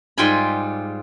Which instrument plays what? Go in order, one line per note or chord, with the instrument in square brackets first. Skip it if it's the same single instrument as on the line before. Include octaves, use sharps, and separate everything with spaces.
[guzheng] G#2 G3 F4 G5 G#5 B5